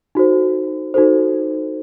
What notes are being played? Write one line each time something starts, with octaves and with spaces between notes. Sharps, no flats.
D#4 F#4 A4 C5
D#4 F#4 A4 C5